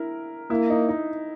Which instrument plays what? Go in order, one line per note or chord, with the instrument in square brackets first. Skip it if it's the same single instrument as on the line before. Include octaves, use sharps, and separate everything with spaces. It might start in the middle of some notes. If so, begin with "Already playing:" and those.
Already playing: [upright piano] E4 A#4
[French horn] A#3 [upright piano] E4
[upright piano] D#4
D#4